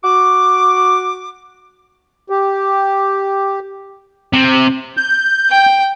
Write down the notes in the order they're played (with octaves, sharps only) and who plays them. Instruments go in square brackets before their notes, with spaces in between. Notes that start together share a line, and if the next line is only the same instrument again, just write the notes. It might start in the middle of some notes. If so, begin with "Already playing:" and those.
[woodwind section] F#4 D6
[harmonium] G4
[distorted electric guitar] C3
[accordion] G6
[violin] G5